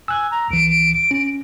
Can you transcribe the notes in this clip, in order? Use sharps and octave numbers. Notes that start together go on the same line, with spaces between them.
G#5 E6 F#6
A#5
C2 E3 D7
C#4